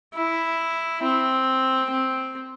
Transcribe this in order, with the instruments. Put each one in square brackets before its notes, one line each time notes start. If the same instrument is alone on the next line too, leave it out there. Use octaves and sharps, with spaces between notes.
[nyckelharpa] E4
C4
C4